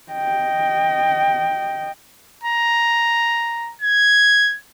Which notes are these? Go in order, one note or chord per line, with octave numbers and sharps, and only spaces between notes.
D#5 G5
A#5
G#6